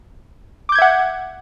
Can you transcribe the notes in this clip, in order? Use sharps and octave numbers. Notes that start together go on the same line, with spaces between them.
E5 F#5 D6 G6 G#6